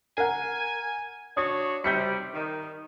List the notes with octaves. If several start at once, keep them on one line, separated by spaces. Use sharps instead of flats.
A#4 F#5 G#5
D4 F#4 C#5 D#6
C3 G3 G6 B6 C#7
D#3